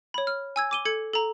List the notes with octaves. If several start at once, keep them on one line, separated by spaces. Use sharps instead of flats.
C#5 B5
F6
G#5 E6 G#6
D6 D#7 G7
A4 G#6 C#7
A4 A#5